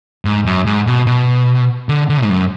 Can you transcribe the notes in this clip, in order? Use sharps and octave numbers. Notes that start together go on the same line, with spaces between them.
G#2
F#2
G#2
B2
B2
D3
D3
G#2
F#2